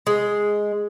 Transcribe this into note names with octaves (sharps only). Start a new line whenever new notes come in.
G#3